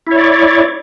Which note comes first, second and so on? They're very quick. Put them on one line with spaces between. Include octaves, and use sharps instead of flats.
E4 C#5 D5